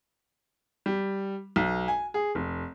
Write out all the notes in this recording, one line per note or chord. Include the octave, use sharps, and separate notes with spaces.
G3
B1
G#5
G#4
F1